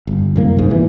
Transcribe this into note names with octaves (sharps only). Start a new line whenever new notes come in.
G1
C2 F#2 A#3
G#1 G#2
E2 A#2 E3